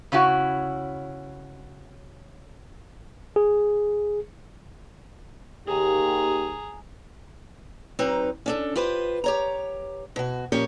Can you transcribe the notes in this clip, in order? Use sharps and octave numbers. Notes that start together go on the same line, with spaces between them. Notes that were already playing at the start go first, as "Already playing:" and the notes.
C#3 C#4 E4 F#4
G#4
D#2 G4 G#4 A#5
F#3 C4 D#4 B4 A#5
C#4 D4 A4
F4 G4 B4 C5
G4 C#5 A#5
B2 F#4
A#2 F3 C#4 G4 A#4 C#5